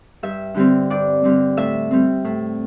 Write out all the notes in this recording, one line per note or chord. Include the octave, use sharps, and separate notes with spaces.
G2 E5
D3 G3 C4
G2 D5
D3 G3 C4
A2 E5
G3 C4
A2